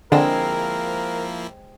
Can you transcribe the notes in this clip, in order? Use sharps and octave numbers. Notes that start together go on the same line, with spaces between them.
D3 F3 G#3 A#3 C4 E4 A#4